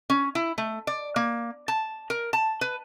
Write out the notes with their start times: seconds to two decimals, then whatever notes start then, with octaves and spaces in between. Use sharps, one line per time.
0.10 C#4
0.35 E4
0.58 A3
0.87 D5
1.16 A#3
1.68 A5
2.10 A#4
2.33 A5
2.61 B4